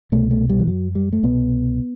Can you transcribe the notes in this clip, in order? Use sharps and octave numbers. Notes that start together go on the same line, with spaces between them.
C2 B2 A3
A3
G3
E3
F#2 F#3
G3
A3
C2 B2 B3